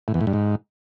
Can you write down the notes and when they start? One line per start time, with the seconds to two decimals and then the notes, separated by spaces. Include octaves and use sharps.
0.08 A2
0.14 E2
0.21 A2
0.27 G2
0.33 G#2